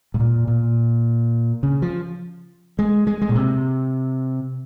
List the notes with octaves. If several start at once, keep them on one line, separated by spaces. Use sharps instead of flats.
G#2
A#2
A#2
C#3
F3
G#3
G#3
G#3
A#2
C3